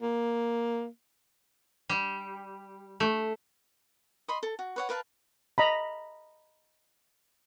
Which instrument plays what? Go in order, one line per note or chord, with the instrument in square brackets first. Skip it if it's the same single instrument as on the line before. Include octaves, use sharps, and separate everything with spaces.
[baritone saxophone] A#3
[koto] G3
A3
[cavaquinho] D#5 B5 C6
A4
F#4
B4 C#5 F#5
A#4 B4 F5 A5
[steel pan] D#5 A#5 B5